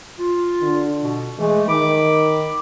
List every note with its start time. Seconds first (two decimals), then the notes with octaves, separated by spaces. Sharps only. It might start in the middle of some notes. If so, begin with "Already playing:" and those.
0.19 F4
0.62 D3
1.02 B2
1.39 E3 G#3 A3
1.68 D#3 B5 D6